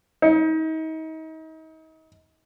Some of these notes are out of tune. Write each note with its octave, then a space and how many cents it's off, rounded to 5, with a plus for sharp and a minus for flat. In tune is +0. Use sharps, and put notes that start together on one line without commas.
D#4 +35